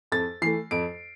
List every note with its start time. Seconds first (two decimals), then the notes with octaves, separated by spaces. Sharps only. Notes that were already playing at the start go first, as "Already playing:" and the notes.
0.12 F2 A6
0.42 E3 A3 C7
0.71 F2 D7